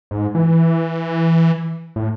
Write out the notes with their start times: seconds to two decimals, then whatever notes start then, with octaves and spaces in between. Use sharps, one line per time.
0.11 G#2
0.35 E3
1.96 A2